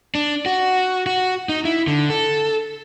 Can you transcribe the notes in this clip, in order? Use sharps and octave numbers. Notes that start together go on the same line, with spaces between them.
D4
F#4
F#4
D#4
E4
D3
A4